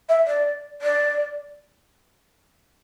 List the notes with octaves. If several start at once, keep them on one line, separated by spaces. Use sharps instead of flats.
E5
D5
D5